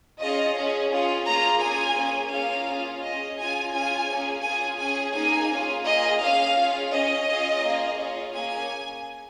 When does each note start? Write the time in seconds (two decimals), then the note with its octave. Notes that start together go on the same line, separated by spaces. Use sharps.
0.20 C#4 F4 G#4 D#5
0.55 C#4 G#4
0.90 C#4 F4 G#4
1.26 A#3 F4 G#4 A#5
1.61 C#4 F4 G#4 G#5
1.96 A#3 C#4 G#4
2.32 A#3 C#4 F4 G#4 F5
2.67 C#4 F4 G#4
3.03 C#4 G#4 D#5
3.38 C#4 F4 G#4 G#5
3.73 C#4 F4 G#4 G#5
4.09 A#3 C#4 G#4
4.43 C#4 F4 G#4 G#5
4.79 C#4 G#4 G#5
5.14 A#3 D#4 G#4 G#5
5.50 C#4 F4 G#4
5.85 A#3 F4 G#4 D#5
6.21 C#4 G#4 F5
6.57 C#4 F4 G#4
6.91 C#4 G#4 D#5
7.27 C#4 F4 G#4
7.62 A#3 F4 G#4
7.97 C#4 F4 G#4
8.32 A#3 C#4 G#4 G#5